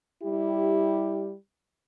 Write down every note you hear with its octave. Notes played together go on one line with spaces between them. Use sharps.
G3 E4 G4